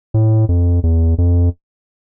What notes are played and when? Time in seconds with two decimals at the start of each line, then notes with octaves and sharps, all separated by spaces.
0.14 A2
0.49 F2
0.83 E2
1.18 F2